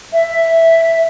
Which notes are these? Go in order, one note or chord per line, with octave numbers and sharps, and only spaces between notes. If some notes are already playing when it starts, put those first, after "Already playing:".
E5